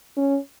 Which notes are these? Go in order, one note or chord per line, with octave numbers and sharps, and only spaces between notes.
C#4